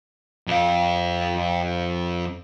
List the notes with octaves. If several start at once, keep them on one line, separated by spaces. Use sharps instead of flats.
F2 F5